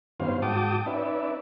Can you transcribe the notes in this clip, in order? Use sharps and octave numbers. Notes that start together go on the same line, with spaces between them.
G2 D#3 B3 C#4 C5 F5
G#2 F#4 G5 A5 D6 D#6
C#4 D#4 B4 D5 E5